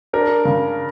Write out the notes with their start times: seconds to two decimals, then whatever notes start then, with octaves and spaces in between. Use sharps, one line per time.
0.13 D4 A#4
0.45 C#3